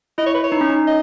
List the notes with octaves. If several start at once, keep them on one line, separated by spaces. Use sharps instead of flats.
E4 D#5
C#5
B4
C#5
D#4
C#4
D#4
D#5